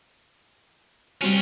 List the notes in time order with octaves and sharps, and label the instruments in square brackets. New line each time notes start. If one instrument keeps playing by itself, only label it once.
[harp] G3 C4 F#4 [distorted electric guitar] C#4 F4